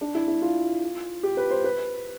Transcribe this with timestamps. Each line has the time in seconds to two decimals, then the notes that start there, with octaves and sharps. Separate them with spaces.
0.01 D4
0.15 E4
0.28 E4
0.42 F4
1.23 G4
1.37 B4
1.51 C5
1.64 B4